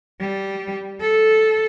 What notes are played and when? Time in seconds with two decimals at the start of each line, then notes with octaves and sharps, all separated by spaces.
0.20 G3
1.01 A4